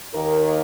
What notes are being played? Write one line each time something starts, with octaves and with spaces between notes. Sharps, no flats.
D#2 D#3 A#4